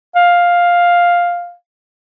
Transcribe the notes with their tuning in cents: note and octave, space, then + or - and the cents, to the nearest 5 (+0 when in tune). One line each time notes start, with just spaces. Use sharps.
F5 +5